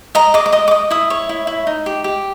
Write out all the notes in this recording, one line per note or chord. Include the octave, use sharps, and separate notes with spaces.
D#5 A#5
D#5 D6
D6
D#5 D#6
D6
D#5 D#6
E4 D#6
C#5
E4
E4
D#4
G4
G4